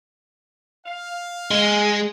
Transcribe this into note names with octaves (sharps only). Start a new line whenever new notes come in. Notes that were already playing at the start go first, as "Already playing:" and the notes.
F5
G#3